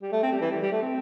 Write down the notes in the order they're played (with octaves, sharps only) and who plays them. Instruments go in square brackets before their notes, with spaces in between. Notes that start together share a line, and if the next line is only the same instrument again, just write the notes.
[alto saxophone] G3
A3
C4
G3
E3
G3
G3
A3
C4